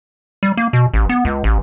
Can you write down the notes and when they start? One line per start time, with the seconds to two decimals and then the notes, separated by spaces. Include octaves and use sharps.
0.43 G3
0.57 A#3
0.73 B2
0.94 A1
1.09 B3
1.25 C#2
1.44 A1